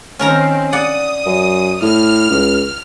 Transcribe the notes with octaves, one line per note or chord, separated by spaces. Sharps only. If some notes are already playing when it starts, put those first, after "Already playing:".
D#3 C4 C#4 A#4 A#5
D5 F#5 D#6
F#2
A2 F6
C#2